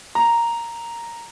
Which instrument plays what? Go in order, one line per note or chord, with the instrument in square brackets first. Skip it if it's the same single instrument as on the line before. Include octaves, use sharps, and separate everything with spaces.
[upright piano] A#5